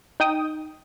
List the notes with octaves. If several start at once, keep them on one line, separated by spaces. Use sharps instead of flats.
D#4 G5 D#6